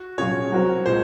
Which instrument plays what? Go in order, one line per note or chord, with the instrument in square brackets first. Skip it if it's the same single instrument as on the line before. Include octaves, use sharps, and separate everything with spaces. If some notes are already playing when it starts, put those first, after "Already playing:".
Already playing: [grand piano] F#4
[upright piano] A#2 F#3 C#4 F4 G#4 [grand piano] C#5
[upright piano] F#3 C4 F#4 A#4
[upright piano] A#2 G#3 [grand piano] C5